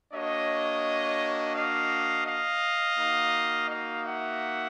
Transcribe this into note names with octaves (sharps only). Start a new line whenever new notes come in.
A#3 D4 F#4 C#5 D#5
D#5 F5
D#5 F5
A#3 D#4 F#4
D#5 F5
E5 F#5